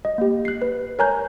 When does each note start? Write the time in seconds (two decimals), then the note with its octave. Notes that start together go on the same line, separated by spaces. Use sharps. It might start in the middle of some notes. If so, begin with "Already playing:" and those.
0.05 D#5
0.18 A#3 G4
0.45 F#6 C7
0.62 B4
0.99 A#4 C#5 G#5 A#5 F#6 G6